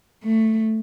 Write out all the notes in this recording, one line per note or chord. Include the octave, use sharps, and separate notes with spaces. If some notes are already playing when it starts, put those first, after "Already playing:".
A3